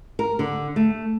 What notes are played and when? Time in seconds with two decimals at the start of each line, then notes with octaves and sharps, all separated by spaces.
0.19 A#4
0.39 D3
0.76 A3